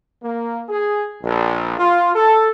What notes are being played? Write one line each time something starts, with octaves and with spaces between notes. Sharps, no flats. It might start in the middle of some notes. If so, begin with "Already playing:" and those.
A#3
G#4
A#1
F4
A4